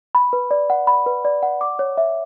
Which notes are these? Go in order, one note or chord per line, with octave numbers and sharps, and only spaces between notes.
B5
B4
D5
F#5
B5
B4
D5
F#5
D6
C#5
E5